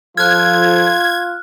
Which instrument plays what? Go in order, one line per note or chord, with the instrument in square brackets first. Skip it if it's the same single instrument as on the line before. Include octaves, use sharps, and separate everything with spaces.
[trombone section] F3 A4 [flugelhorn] F4 [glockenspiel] F6 F#6 [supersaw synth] G#6